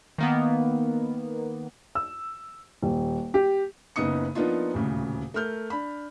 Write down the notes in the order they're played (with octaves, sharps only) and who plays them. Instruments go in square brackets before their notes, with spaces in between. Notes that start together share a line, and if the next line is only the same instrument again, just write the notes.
[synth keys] D#3 A#3 B3
[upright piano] E6
D#1
G4
[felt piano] F#1 C#3 B3 D#4 D#6 C#7
F3 A#3 B3 D4 D#4 F4
D#1 D2 A2 C#3
A3 A#4 F6 G6
D4 B5